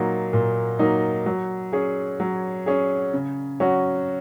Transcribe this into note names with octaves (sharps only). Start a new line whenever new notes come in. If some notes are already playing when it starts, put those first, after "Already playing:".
Already playing: A#2 F#3 A#3 D#4
A#2
F#3 A#3 D#4
F#3
C#4 G#4
F#3
C#4 G#4
C#3
F#3 C#4 F#4